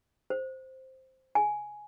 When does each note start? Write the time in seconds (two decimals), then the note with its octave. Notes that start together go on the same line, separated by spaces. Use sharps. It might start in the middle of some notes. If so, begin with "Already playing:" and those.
0.30 C5
1.35 G#5